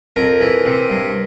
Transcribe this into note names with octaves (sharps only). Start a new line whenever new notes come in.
F2 A#4
E3
C3
G2